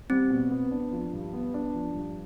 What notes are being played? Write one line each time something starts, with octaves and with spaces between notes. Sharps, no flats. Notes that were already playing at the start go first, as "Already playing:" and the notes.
G3 C4
B2
B3
D4
F3
G2
B3
D4
F3
G2